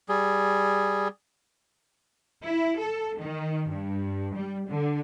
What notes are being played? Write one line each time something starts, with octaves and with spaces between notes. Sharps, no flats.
G3 G#4
E4
A4
D#3
G2
G3
D3